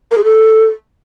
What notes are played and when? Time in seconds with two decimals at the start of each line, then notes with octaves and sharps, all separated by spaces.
0.11 A#4
0.18 G#4
0.24 A4